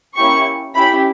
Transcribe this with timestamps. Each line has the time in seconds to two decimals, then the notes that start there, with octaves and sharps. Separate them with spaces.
0.16 A#3 C#4 E4 G4 C#6
0.75 C#4 E4 G4 B5